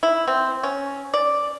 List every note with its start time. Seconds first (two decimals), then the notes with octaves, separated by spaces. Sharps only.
0.03 E4
0.28 C4
0.63 C#4
1.14 D5